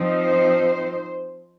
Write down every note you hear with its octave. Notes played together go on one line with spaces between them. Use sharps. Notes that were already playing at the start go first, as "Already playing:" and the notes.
Already playing: F3 C4 D#4
C5